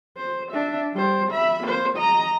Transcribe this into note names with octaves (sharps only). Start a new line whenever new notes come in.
C5
D4 E5
G3 C5
E5 B5
A#3 C5
D#5 A#5